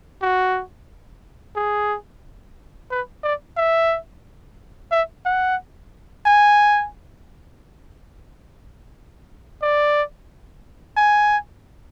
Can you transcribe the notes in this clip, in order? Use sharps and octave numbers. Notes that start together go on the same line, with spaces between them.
F#4
G#4
B4
D5
E5
E5
F#5
G#5
D5
G#5